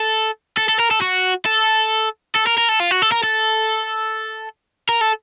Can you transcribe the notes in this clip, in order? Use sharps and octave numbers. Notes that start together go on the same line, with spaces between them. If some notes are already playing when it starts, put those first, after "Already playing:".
Already playing: A4
A4
A4
A#4
A4
F#4
A4
A4
A#4
A#4
A4
F4
F#4
A4
A#4
A4
A#4
A4